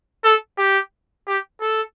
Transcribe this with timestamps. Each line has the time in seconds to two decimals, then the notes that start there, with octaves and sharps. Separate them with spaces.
0.24 A4
0.58 G4
1.27 G4
1.61 A4